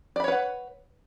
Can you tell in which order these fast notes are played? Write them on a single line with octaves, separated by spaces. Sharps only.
D5 B5 C#5 B4 F#5